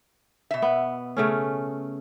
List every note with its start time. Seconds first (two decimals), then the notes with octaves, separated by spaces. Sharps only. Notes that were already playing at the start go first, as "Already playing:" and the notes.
0.51 B2 E5
0.62 B3
1.17 C#3 A3 C#4